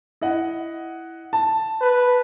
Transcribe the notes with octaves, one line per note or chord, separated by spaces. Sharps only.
E4 D#5 F#5
A5
B4